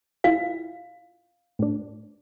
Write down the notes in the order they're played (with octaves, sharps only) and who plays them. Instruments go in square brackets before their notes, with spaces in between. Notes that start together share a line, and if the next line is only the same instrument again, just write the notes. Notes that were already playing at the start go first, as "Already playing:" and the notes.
[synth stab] E4 F4 [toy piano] F5
[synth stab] A2 D4